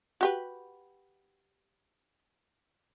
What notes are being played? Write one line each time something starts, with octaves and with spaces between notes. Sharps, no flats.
F#4 G4 B4